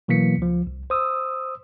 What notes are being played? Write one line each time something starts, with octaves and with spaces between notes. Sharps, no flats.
B2 E3 F#3 A#3 B6 C#7
C#2 F3
C2
C5 D#6 E6